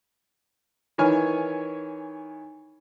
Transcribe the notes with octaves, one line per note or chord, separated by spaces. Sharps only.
D#3 E3 C#5 G#5 F6